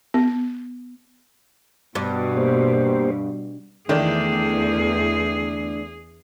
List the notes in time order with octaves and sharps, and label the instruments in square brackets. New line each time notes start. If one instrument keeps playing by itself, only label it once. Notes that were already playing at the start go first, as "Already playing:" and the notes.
[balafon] B3
[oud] G2 [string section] B2
[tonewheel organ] A#3 G4 C5
[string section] E2 [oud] D3 A3 [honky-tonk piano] D#3 D4 [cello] G#4